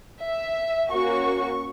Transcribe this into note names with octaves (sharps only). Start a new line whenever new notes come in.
E5
A#3 C#4 F#4 C#6